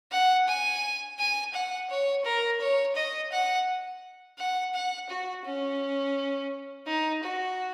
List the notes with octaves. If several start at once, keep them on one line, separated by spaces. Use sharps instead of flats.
F#5
G#5
G#5
F#5
C#5
A#4
C#5
D#5
F#5
F#5
F#5
F#4
C#4
D#4
F#4